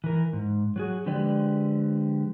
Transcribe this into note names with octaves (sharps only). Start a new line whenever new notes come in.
E3 A#4
G#2
F#3 F#4 G#4
D3 F3 G#3 G4 B4 D5